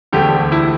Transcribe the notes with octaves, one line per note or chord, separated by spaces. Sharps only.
E1 D2 D3 A3 G4
E4